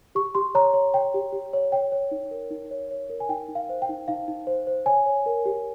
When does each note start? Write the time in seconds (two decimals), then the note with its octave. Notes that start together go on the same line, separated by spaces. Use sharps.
0.15 G4 C#6
0.35 G4 C6
0.55 C#5 A#5
0.74 C#5
0.94 C#5 G5
1.14 G4
1.33 G4
1.53 C#5
1.72 C#5 G5
1.92 C#5
2.11 D#4
2.31 A#4
2.51 D#4
2.71 C#5
2.91 C#5
3.10 A#4
3.20 G#5
3.29 D#4 G5
3.48 D#4
3.55 F5
3.69 C5
3.82 G5
3.89 D#4
4.08 D#4 F5
4.28 D#4
4.47 C5
4.67 C5
4.86 C#5 G#5
5.06 C#5
5.26 A#4
5.45 G4